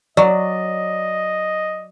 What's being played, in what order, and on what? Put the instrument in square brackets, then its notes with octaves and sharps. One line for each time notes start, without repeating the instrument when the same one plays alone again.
[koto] F#3 [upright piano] D5 [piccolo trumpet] D#5